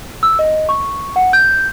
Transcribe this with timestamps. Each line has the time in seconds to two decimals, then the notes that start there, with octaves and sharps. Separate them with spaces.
0.23 E6
0.39 D#5
0.69 C#6
1.16 F#5
1.33 G6